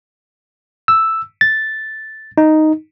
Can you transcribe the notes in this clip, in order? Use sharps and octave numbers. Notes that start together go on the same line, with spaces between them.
E6
A6
D#4